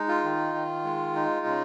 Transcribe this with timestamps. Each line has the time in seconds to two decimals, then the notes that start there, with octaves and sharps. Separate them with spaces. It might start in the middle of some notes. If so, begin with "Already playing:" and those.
Already playing: G#3 D#4
0.08 F4
0.24 D#3
0.54 D#3
0.84 G#3
1.15 D#4
1.46 C#3